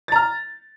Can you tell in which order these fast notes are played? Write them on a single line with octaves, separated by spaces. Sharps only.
A6 A#5 F6